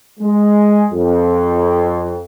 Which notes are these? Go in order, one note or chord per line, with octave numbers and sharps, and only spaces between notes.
G#3
F2